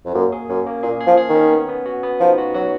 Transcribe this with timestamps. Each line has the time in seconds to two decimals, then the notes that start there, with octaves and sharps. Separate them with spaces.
0.05 F2
0.14 F#2 A#3
0.32 G#4
0.49 F#2 C#4
0.67 A#3
0.83 A#2 G#4
1.00 G#4
1.07 F3
1.18 G#4
1.29 D#3
1.35 C#4
1.51 B3
1.68 B3
1.86 F#4
2.03 B3
2.20 F3 D#4
2.38 F#4
2.54 F#3 F#4